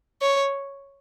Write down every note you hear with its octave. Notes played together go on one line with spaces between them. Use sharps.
C#5